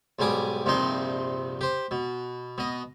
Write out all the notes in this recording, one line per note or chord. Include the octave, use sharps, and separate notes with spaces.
B1 G#2 G3 G#5 D6 D#6
A#1 G2 C3 F3 D#4 C6
G4 C5
B2
B2 D#5